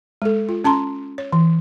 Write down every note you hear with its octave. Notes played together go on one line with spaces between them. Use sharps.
G#3 A4
F4
C#4 A5 A#5 C6
C#5
E3